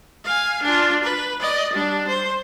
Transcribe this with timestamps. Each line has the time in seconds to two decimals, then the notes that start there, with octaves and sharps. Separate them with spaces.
0.24 F5 G#5
0.62 D4 F4
1.03 B4
1.40 D5 D#5
1.73 G3 D4
2.07 C5